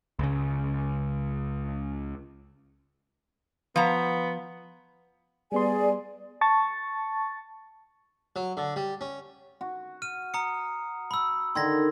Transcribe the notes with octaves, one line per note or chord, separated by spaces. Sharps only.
C#2 C#3
F3 B3 A#5
G3 B3 G#4 D5 G#5 C6
A5 C#6 A6
F#3
D3
G3
C#4
F#4
F6 D#7
A#5 D#6 C#7
B5 E6
D3 D#3 C6 G#6 A#6